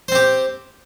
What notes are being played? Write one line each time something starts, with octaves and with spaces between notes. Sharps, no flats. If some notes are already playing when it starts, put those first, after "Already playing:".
C4 G4 C5